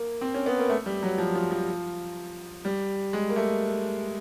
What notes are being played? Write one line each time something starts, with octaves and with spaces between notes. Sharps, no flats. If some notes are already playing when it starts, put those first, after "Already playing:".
Already playing: A#3
C4
C#4
B3
A#3
A3
G3
F#3
F3
F3
F3
G3
G#3
A#3
A3